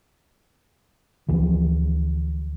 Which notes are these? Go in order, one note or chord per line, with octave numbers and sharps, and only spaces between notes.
D2 E3 F3